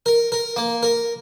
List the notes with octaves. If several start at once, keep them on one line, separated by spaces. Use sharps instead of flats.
A#4
A#4
A#3
A#4